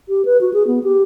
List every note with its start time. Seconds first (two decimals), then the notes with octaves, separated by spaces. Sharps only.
0.09 G4
0.25 B4
0.41 F#4
0.54 G#4
0.67 B3
0.84 G4